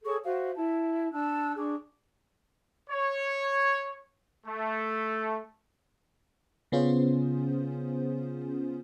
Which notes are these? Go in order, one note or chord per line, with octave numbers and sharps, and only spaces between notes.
G#4 A4 C#5 C#6
F#4 C5 E5 F5
E4 A5
D4 A5 E6 F#6
D4 G#4 C#6 D6
C#5
A3
C#3 B3 C#4 F4 G#4 C5